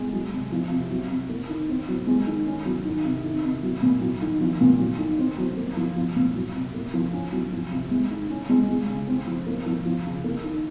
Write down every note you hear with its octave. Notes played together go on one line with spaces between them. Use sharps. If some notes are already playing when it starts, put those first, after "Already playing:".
Already playing: G#3
F#3
C3
F3
C3
F#3
C3
A#3
D#3
C4
F#3
G#3
D#3
C#4
F#3
D#3
C3
D#3
C3
F#3
A#2
F#3
D#3
F3
A#2
F#3
D#3
C4
F#3
A#3
F3
F3
A#2
F#3
C3
A#3
F3
C#4
F#3
F3
C3
G#3
D#3
C#4
G#3
G#3
C#3
C4
F3
A#3
F3
F3
C#3
A#3
D#3